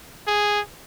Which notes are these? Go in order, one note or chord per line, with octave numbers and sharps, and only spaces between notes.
G#4